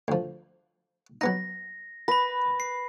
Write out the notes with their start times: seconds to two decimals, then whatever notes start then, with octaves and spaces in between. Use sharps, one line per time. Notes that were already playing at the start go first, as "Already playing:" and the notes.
0.08 D2 F3
1.21 F#3 B3 D#4 A#6
2.08 B4 B5 A#6
2.60 C7